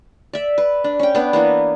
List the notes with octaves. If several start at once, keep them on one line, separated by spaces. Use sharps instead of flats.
D5 E5
B4
D4
C#4 G5
B3 D4
E3 A#3 B3